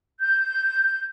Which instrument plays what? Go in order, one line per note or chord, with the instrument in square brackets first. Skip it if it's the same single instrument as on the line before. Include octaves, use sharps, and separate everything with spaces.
[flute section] G6